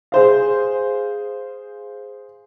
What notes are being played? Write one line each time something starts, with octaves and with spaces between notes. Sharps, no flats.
G#4 C5 F5